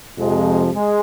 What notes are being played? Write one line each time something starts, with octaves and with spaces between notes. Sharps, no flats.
F2 C3 F3 G#3
G#3